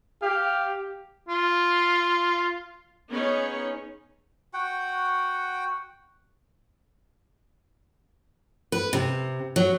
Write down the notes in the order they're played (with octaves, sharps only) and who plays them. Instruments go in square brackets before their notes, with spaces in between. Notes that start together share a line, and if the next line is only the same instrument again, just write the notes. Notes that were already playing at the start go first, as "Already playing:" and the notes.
[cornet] G4 [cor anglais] F5
[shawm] F4
[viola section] B3 C#4 D#4 G#4 C#5
[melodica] F#4 F#5 G5
[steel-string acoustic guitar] B4
C3
F#3